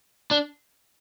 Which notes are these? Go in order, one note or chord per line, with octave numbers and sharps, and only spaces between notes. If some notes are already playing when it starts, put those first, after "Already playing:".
D4